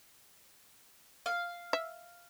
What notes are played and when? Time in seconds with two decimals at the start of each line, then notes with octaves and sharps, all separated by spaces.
1.26 F5
1.73 E5